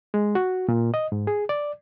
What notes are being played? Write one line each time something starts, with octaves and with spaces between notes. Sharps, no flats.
G#3
F#4
A#2
D#5
G#2
G#4
D5